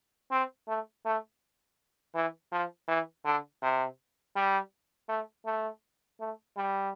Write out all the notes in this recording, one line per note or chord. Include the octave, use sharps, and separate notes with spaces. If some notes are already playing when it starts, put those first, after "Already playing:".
C4
A3
A3
E3
F3
E3
D3
C3
G3
A3
A3
A3
G3